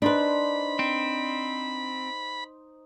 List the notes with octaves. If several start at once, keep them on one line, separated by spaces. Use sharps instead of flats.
D4 D#4 B4 C5 D5 B5
C4